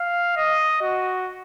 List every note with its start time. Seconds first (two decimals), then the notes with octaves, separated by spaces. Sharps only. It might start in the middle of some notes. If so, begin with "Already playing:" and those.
Already playing: F5
0.37 D#5
0.81 F#4